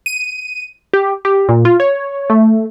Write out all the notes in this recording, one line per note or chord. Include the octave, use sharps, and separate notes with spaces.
D#7
G4
G4
A#2
F4
C#5
A3